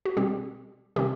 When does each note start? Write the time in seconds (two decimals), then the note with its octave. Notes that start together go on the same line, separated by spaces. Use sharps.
0.05 F#4
0.17 B2 G3 C4 G4
0.96 C3 D#3 G3 C4 G4